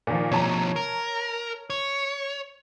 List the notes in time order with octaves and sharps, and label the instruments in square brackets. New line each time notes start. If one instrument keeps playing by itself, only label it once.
[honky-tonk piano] A#2 D#3 F3
[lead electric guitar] B2 F3 [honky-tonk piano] C#5 A5 A#5
[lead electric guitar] A#4
C#5